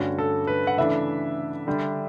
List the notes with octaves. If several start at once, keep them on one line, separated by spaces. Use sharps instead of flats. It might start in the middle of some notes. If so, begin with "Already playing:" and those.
Already playing: G2 D3 A3 C#4 F#4
A4
B4
F#5
C#3 E3 A3 D4 E5
D3 G3 D4